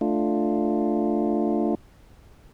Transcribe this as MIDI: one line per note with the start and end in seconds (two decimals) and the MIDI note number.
0.01 1.75 57
0.01 1.75 62
0.01 1.75 65